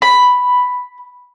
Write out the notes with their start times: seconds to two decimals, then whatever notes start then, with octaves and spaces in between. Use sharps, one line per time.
0.02 B5